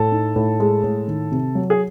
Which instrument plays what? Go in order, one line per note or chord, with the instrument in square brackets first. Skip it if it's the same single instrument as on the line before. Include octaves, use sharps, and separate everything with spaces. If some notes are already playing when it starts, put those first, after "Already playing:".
Already playing: [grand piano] A2 [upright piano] A4
[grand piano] D#4
A2
G#3
A2
D#3
C3
F#3
[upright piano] G#4